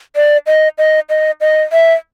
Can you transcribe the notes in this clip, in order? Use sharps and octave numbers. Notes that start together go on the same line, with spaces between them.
D5
D#5
D#5
D#5
D#5
E5